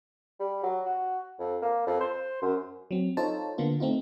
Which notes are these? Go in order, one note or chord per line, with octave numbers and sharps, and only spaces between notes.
G3
F#3
F#4
F2
A#3
F2
C5
F#2
F#3 C4
D#4 F4 A4 C5 C#5 A5
D3 A#3 B3 F4
A3 C4 D#4 F4